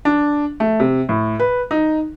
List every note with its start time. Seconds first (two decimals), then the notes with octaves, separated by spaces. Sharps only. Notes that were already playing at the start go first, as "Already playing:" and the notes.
0.05 D4
0.60 A3
0.80 C3
1.09 A2
1.39 B4
1.71 D#4